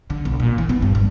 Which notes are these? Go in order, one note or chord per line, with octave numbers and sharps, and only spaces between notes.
D3
B1
A#2
E3
B3
G2
G1